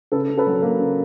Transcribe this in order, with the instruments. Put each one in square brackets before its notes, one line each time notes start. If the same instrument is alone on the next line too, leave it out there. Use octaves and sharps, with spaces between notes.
[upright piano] C#3 A4 B4
C#3
A4 B4
F#3
A#3
C#3